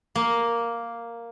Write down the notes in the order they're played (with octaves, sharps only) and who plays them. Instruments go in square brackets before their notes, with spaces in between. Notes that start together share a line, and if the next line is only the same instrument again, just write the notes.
[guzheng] A#3